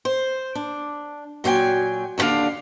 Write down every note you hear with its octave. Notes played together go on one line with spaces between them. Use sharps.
C5
D4
A#2 F#3 C5 G5 G#5
D#2 A2 D3 D4 F5